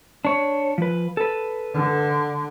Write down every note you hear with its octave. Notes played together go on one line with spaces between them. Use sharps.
D4 C#5
F3 B4
A4 B4
D3